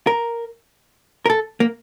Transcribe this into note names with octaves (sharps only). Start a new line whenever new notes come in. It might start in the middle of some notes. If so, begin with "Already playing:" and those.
A#4
A#4
A4
A#3